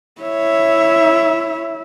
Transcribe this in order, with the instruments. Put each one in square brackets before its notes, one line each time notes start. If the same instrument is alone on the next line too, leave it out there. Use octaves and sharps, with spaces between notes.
[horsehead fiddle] E4 E5 [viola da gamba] C#5